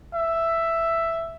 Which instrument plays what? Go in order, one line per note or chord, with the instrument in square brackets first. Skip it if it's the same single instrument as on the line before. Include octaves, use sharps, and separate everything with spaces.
[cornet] E5